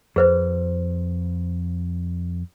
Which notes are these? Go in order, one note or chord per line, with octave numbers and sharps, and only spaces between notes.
F2 G#4 B4 C5